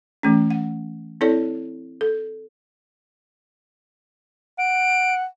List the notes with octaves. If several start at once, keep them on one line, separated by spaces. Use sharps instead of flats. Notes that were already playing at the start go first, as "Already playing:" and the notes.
E3 A3 C#4
F#5
C4 E4 A4 C#5 D5
A4
F#5 D7